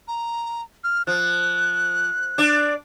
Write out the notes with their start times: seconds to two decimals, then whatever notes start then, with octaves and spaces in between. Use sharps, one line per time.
0.08 A#5
0.84 F6
1.07 F3 F#6
2.38 D4 D5